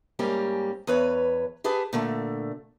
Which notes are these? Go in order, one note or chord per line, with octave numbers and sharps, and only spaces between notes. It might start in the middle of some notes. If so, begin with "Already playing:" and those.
G#2 G3 A#3 C#4 G4
E2 B4 C#5
G4 G#4 B4 A5
A#2 D3 A3